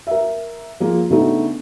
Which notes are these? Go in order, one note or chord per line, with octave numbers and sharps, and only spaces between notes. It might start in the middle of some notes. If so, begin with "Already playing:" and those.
A#4 E5
F3 A#3 F4 G#4
C#3 A3 B3 D4 D#4 A4